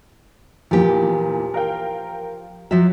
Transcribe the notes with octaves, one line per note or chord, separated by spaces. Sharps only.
E2 A#2 F3 G4
A#4 F5 G5
F3 F#3 E5